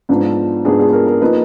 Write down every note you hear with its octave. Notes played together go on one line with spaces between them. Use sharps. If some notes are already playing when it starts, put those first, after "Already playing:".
G#2 F3 B3 D4
G#2 F3 B3 D4 G#4
G#4
A#4
A#4
F3 A#3 D#4 B4